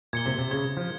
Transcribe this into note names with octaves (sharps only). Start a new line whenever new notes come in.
A#2 G#6 C#7 G7
C3
C3
C#3 G#6 C#7 G7
F3